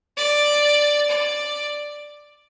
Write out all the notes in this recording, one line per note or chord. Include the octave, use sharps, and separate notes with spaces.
D5
D5